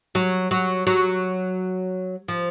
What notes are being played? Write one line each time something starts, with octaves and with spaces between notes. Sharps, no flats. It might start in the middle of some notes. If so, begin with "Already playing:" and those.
F#3
F#3
F#3
F3